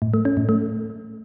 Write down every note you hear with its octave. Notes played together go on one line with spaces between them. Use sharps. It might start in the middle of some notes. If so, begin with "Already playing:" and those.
A2
A3
C#4
A2
A3